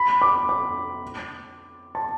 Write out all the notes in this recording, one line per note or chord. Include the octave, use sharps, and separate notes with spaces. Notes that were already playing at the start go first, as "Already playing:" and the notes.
Already playing: B5
D6
D6
A5